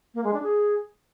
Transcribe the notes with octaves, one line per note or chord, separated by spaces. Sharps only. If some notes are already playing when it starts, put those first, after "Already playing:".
A#3
G#3
D4
G#4